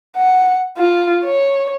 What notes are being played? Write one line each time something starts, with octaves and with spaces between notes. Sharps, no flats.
F#5
F4
C#5